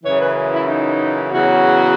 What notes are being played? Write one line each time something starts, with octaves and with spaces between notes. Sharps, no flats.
F#2 C#3 E3 C#5
B4
E4
D#4
E2 C#3 F#3 F#4